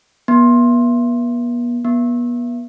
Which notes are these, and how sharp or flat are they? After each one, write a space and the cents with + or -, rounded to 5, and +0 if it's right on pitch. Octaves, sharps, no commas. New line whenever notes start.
B3 -40
B3 -35